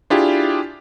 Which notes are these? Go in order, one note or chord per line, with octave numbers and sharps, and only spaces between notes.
D4 E4 F4 G4 G#4